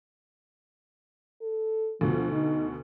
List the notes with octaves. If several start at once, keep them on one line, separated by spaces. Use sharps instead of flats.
A4
D2 B2 F3
D#4